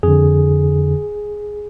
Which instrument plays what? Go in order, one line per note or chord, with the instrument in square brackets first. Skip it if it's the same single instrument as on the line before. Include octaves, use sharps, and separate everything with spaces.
[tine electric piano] F2 D3 G#4